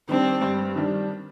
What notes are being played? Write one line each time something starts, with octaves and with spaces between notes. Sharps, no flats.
D#3 G3 C4 D4
G2
D#3 G3 D4